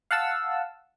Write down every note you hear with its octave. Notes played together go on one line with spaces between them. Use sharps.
F5 F#5 A5 E6